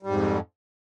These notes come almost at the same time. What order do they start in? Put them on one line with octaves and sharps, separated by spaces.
G3 G#2 F2